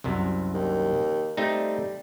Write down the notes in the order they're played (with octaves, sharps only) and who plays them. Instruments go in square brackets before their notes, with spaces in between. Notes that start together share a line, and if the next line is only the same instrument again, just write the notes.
[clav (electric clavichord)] C2 F#2 C3
[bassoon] D#2
[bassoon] G3 [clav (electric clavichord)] A3 C4 D#4